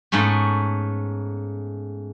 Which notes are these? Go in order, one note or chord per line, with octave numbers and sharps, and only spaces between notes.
G#2 A3 B3 C#4